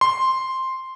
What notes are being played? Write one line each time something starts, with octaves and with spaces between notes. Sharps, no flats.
C6